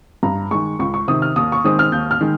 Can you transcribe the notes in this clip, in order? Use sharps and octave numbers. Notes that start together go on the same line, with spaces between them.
G2 A#5
D#3 G#3 C#6
C#2 C#6
C#6
C3 D#3 D#6
F6
D#2 D#6
C#6
D#3 G#3 C4 D#6
F6
D#2 G6
F6
D#3 G#3